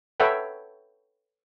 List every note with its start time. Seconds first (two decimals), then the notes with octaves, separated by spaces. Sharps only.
0.20 A4 B4 C#5 E5 F#5 G5